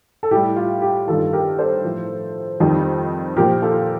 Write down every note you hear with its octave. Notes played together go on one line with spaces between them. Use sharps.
A4
A2 G3 G4
F4
G4
G2 D#3 G3 F4 A4
G4 A#4
A4 C5
A2 F3
F2 D#3 G3
A#2 F3 G4 A#4
F4 A4